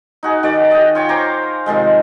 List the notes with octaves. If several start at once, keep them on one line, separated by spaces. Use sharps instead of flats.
D#4 F#4 G#4
D#3 F#4 D5
D#5 G5
F4 C#5 G5
C5 G#5 A#5 D6
C3 D#3 F3 G#3